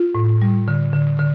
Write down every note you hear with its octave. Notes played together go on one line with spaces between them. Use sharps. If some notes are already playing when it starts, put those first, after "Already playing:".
Already playing: F4
A2
G3
D3
D3
D3